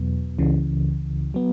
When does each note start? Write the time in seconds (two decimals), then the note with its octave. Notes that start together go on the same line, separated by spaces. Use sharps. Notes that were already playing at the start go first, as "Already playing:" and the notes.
Already playing: E2 B2 F#3 B3
0.39 C#2 C#3 E3
1.34 F#3 B3